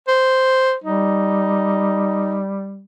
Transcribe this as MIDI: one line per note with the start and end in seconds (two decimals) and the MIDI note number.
0.08 0.75 72
0.84 2.84 55
0.84 2.40 63